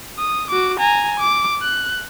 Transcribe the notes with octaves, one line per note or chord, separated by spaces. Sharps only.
D#6
F#4 D6
G#5 A#5
D6
F#6